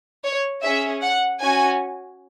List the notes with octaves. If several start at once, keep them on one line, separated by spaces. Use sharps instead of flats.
C#5
C#4 G#4 E5
F#5
C#4 F#4 G#5